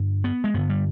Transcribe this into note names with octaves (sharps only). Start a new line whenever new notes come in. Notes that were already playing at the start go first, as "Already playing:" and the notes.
Already playing: G2 D3
B3
G#3
G2 D3 B3
G3